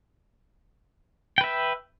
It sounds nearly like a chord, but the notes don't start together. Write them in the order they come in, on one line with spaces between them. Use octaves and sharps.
G5 B4 E5